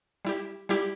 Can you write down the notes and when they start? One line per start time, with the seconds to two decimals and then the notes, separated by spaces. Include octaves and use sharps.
0.25 G3 E4 G4
0.69 G3 E4 G4